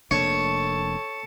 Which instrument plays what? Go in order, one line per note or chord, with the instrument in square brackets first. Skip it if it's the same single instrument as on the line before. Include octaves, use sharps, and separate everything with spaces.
[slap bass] F1 A#3 D4 [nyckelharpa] A4 A5 [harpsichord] C#5 [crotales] C#7